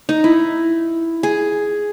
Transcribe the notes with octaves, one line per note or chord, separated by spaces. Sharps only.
D#4
E4
G#4